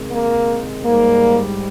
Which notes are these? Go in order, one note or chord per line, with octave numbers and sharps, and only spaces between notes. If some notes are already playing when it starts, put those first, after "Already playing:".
Already playing: C3 D#3 G#3
A#3
G#2 G3 A#3